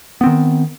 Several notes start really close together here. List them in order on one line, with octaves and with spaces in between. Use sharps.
B3 C4 D#3